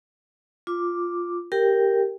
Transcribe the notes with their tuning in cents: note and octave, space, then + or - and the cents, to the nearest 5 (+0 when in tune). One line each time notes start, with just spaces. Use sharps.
F4 +0 D6 +0
G4 +0 A#4 -5 G5 +0